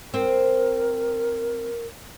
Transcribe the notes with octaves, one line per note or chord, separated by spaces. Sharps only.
C4 A#4